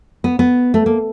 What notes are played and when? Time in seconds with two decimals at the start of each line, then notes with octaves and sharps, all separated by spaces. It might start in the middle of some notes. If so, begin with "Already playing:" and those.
0.24 B3
0.39 B3
0.74 A3
0.86 A#3